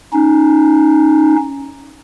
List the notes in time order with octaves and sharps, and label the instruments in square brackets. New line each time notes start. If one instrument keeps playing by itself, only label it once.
[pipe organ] C#4 D#4